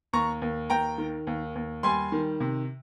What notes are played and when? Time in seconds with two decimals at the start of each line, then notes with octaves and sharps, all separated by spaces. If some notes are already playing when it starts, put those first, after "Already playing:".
0.13 D#2 A#5 C#6
0.42 D#2
0.70 D#2 G5 A#5
0.98 D#3
1.27 D#2
1.55 D#2
1.83 G3 G#5 C6
2.12 D#3
2.40 C3